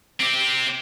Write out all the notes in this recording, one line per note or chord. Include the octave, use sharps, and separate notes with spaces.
C4 G4